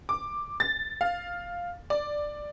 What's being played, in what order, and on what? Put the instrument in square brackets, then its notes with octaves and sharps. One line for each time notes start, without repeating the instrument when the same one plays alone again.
[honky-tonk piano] D6
A6
F5
D5